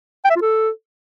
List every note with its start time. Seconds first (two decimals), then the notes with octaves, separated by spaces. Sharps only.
0.24 G5
0.30 E5
0.36 F4
0.41 A4